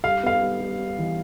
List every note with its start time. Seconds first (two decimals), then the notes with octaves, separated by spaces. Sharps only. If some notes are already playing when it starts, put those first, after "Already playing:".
0.04 G3 F5
0.23 B3 F5
0.42 G3
0.61 G3
0.79 G3
0.98 E3